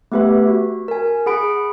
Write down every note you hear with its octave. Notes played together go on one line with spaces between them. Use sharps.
A3 B3 G4 B4 E5
F#4
A#4 G#5
G#4 F#5 B5 D7